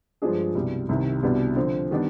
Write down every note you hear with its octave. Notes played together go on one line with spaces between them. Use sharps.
G2 F3 G#3 D4 G#4
C2 B2 G3
C2 C3 D#3
C2 B2 G3 B3 D4
D3 F3 C4
D#3 G3 B3 D4